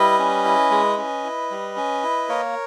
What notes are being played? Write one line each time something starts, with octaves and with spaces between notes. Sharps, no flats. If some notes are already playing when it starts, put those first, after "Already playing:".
Already playing: G3 E4 B4 D#5
C#4
E4
G#3
C#4
E4
G3
C#4
E4
A#3 A#4 C#5